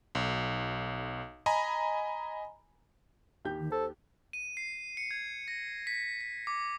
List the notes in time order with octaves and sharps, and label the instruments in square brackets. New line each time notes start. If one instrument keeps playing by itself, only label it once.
[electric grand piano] B1
D#5 G#5 A#5 B5
[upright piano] D#2 G4 G6
[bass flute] D#3
[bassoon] A4 [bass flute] C5
[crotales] D#7
C7
C#7
G#6
A#6
B6
B6
D6